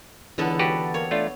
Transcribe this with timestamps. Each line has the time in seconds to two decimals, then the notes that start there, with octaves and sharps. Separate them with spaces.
0.38 C#2 D3 E3 B3 A4 A6
0.59 F#4 G4 B4
0.94 A#3 C#5
1.11 A3 D4 F4